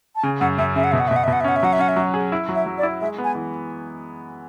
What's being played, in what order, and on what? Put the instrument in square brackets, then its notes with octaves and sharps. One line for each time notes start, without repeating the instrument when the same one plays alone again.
[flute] A5
[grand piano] C#3 [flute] G#5
[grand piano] F#2 [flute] F#5
[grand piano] F#2 [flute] E5
[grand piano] C#3 [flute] E5
[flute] F#5
[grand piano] B2 [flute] E5
[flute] F#5
E5
[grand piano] B2
[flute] F#5
E5
[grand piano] B2 [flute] F#5
[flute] E5
[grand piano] C#4 [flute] F#5
[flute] E5
[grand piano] F#3 [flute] F#5
[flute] E5
[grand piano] C#4 [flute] F#5
[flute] E5
[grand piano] F#3
G#4
E4
F#3
[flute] E5
[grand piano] F#3
[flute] D5
[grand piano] E4
[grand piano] G#3 [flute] E5
[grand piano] B3
[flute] G#5
[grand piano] E3